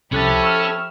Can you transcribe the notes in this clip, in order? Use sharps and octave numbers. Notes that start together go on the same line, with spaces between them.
C2 F3 C#4 E4 G4 A4 F#6 A6
C#6 E6 F6